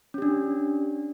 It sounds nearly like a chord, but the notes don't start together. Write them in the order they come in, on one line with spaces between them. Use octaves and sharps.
C#4 G4 D4